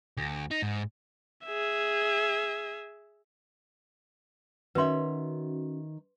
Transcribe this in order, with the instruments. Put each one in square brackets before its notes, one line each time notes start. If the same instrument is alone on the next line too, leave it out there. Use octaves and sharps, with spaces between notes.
[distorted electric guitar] D2
D#4
G#2
[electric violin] G#4 E5
[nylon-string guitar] D#3 C#5 E5 [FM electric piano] C#4 F#4 [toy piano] B4 C6